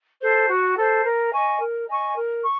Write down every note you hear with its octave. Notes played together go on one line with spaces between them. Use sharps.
A4 C5
F#4
A4 C5
A#4
D#5 G#5 C#6
A#4
D#5 G#5 C#6
A#4
C#6